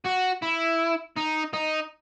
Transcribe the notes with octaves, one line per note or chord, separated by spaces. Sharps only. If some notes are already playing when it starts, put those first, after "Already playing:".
F#4
E4
D#4
D#4